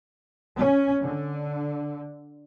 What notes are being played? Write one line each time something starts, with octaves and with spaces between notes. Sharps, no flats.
C#4
D3